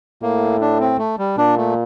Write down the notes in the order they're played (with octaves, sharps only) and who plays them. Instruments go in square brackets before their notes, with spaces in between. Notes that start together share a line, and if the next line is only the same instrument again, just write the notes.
[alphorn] A2 [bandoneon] A#3
[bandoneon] D4
C4
A3
G3
[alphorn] A#2 [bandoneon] D4
[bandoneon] A3